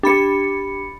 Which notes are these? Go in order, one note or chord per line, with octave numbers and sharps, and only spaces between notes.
D4 G4 B5 C#7